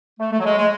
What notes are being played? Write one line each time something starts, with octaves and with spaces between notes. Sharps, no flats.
A3
A3
F#3
G#3
G#3